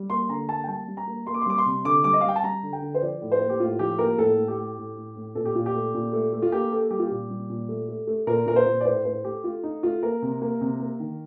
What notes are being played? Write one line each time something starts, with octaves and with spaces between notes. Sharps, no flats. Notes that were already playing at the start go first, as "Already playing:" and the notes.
Already playing: G3
A#3 C6
D3 A#5
A#3 A5
G5
G3 A5
G3
A#5
A#3
A#3 C6
D6
C6
G3 D6
C6
C3
D3 D6
G3 D6
D#5
F5
G3 G5
A5
G3 A#5
D3
G5
D3
C5
F3 D5
A2
C5
A#3
G4
A2 F4
F3 G4
A#3 A#4
A2 A4
A2
G4
A3
A2
A2
A2
A#2 A4
G4
A#2 F4
G4
A3
A#2
A3
A3
F4
A#3 G4
A#3 A4
G3 G4
F4
A#2 G4
G3
A#2
A3
A3
A3
A#2 A#4
A#2 A#4
C5
A#2
D5
A2 C5
A2 C5
A3 G4
A3 F4
A3 D#4
A3 F4
A#3 A#4
C3
A#3
C3
A#3
D#3